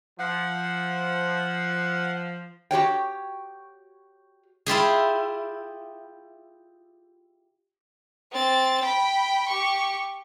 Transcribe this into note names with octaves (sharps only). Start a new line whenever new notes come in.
F3 F#5
F#4 G4 C#5 G5
E4 F4 G4 G#4
C4 A6
G5 B5
G4 C#6